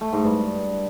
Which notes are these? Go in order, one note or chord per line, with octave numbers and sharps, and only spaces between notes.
A3
G#2
G2